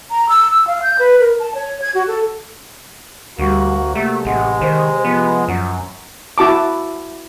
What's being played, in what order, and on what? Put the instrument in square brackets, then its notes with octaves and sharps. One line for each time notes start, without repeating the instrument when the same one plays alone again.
[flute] A#5
E6
E6
F5
G6
B4
A#4
A5
C#5
G#6
F#4
A4
[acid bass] D2 [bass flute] G3 [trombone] A#3 [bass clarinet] F#4
[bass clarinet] C3 [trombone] F#3 [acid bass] A3 [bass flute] A#3
[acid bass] A1 [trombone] G#3 [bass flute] F#5
[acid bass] D#3 [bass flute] C5
[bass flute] F3 [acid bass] B3
[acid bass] F#2 [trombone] F#3
[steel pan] E4 F#4 A5 D6